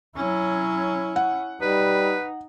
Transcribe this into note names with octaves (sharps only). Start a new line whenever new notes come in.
F#3 C#4 E4
F#5
G3 D#4 B4